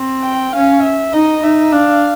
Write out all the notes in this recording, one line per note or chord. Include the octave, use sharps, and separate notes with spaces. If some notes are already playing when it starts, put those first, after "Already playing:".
Already playing: C4
G5
C#4 F5
E5
D#4 D#5
D#4 E5
D4 F5